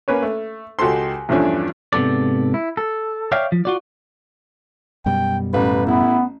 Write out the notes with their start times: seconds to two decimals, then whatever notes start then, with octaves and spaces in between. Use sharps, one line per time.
0.08 A#3 C#4 B4 C#5
0.23 A3
0.79 C#2 F#4 G4 A4 C6
1.29 E2 G2 F3 A3 C#4 D4
1.93 G#2 C3 B3 A4 D5
2.54 E4
2.77 A4
3.32 C#5 D5 E5 F5 G5
3.52 F3
3.65 F4 F#4 D5
5.06 F#2 B2 G3 G5
5.54 A1 B4
5.87 B3 E4